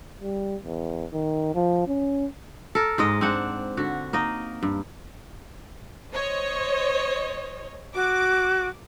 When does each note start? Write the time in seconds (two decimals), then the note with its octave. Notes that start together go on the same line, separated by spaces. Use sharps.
0.21 G3
0.64 E2
1.13 D#3
1.55 F3
1.87 C#4
2.75 A4 A#4
2.98 G#2 G#3 D#5
3.21 C4 D4 F#5
3.77 D3 F#4
4.13 A#3 D#4 D#5
4.63 G2
6.12 C5 C#5 D#5
7.95 F#4 D6